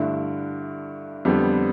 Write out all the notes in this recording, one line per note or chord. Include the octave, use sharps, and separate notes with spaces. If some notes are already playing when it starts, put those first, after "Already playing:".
Already playing: G2 D3 A3 E4
F2 D3 G3 B3